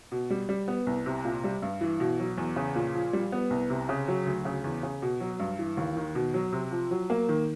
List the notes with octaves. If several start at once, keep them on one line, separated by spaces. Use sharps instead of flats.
B2
G3
G3
B3
C2
C3
A#2
G3
G2
E3
B2
F#3
E2
C#3
A#2
F3
G3
B3
C2
C3
C#3
F#3
D2
C#3
E2
C#3
B2
F#3
G2
E3
D#2
D#3
B2
F#3
C3
F3
F#3
A#3
D#3